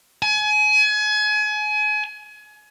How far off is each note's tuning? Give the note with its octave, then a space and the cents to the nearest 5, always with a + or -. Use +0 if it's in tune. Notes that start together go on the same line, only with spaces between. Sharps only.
G#5 +30